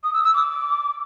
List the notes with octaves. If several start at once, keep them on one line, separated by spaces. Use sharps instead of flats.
D#6
E6
E6
D6